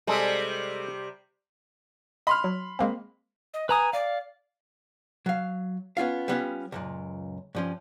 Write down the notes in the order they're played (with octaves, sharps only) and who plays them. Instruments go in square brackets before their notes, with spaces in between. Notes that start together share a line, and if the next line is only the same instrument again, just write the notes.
[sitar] C3 G3 [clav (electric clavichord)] G#3 A4
[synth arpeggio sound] D#5 [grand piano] B5 C6 F6
[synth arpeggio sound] F#3
G#3 A#3 C4
[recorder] D#5
[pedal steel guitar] B4 A#5 D#6 [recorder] G#5
[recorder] D5 [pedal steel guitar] F5
[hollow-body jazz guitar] F#3 F5
B3 C#4 F4 F5
G3 B3 C#4 F4
C#2 F#2 A#2
G2 F3 C#4